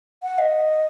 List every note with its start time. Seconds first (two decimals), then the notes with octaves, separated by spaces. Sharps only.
0.23 F#5
0.38 D#5